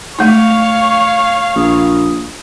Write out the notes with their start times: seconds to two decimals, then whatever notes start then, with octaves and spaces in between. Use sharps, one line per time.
0.19 G#3 A3 D#4 C#5 F5 C#6
1.56 A#1 D#6